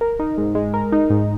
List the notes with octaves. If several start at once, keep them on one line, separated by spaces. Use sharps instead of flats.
A#4
D#4
G#2
G#3
A#4
D#4
G#2